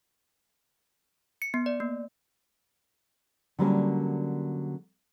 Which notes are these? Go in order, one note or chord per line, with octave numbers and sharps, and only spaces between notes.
C#7
B3
D5
A#3
D3 F#3 G3 A#3 C#4